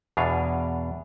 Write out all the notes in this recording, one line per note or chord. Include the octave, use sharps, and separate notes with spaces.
E2 B2 D4 F5 G#5